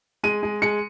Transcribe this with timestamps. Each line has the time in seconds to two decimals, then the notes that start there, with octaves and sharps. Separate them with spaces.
0.23 G#3 D#7
0.43 G#3
0.62 G#3 C#7